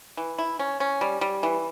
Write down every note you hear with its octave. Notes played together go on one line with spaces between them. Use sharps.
E3
E4
C#4
C#4
G3
G3
E3